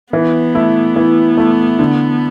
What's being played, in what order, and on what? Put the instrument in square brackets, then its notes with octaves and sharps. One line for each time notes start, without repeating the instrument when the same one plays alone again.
[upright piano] E3 [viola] B3
[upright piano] A3 E4
E3
A3 E4
D3